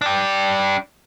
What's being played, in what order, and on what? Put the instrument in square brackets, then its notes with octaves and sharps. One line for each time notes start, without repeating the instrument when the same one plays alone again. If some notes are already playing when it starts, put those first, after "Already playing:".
[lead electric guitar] D4 G4